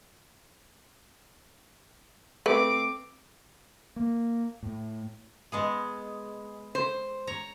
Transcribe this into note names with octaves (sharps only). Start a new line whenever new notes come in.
A3 C4 B4 D6
A#3
A2
G#3 B3 G#4
C5
C#5 A#5